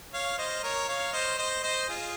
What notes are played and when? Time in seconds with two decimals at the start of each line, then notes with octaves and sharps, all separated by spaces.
0.13 C#5 F5
0.38 C5 D#5
0.63 A#4 C#5
0.88 C#5 F5
1.13 C5 D#5
1.38 C5 D#5
1.63 C5 D#5
1.89 F4 G#4